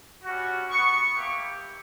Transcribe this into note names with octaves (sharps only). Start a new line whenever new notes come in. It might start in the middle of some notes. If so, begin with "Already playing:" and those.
G3 C#4 F#4
B3 F#4 C#6
A#3 E4 G4